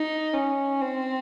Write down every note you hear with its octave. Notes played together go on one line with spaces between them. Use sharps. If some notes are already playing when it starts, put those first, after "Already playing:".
Already playing: D#4
C#4
C4